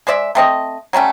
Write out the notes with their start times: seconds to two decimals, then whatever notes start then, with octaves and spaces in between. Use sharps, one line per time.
0.07 G#3 C5 D5 E5
0.35 A3 C4 D#5
0.93 F#3 G3 A3 C#4